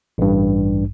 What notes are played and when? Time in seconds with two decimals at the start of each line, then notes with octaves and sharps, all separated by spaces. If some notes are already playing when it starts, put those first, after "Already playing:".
0.18 A1 G2